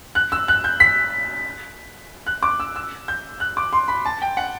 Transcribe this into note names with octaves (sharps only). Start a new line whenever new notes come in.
F#6
E6
F#6
G6
B6
F#6
D6
E6
E6
G6
F#6
D6
C6
B5
A5
G5
F#5